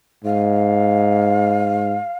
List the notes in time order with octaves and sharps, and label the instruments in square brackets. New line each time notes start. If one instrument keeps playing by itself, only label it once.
[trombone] G#2 [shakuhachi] F5